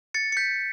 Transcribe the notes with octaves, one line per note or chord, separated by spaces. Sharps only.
A6 C#7
C#7
G6 B6